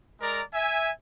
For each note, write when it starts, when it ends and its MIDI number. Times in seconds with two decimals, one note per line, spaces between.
0.20 0.40 56
0.20 0.40 70
0.20 0.40 74
0.20 0.40 82
0.53 0.90 76
0.53 0.90 80